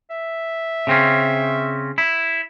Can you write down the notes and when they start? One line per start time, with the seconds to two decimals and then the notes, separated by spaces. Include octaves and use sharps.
0.10 E5
0.87 C#3 C4 C#4
1.98 E4